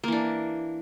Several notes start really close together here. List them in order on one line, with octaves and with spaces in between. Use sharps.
A#3 E3 D4